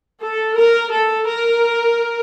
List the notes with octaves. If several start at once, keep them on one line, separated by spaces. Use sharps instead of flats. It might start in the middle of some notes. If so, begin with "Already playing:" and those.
A4
A#4
A4
A#4